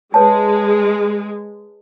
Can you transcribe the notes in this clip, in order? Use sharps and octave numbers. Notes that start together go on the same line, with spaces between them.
G#3 B4 C#5 A5